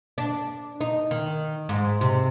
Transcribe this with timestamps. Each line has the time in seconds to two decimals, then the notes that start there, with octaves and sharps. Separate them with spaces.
0.18 D4
0.81 D#4
1.11 D#3
1.69 G#2
2.01 C3